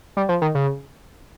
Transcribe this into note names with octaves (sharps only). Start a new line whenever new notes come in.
G3
F3
D#3
C#3